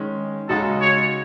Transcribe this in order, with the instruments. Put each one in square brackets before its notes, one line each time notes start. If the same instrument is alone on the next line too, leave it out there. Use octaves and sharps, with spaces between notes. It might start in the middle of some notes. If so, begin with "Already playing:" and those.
Already playing: [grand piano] D#3 G#3 C#4
[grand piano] C#3 G#3 D#4 F#4 [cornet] A4
[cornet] C#5